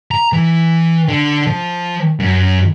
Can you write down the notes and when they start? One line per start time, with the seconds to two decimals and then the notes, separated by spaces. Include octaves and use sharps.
0.11 A#5
0.33 E3
1.08 D3
1.47 F3
2.20 F#2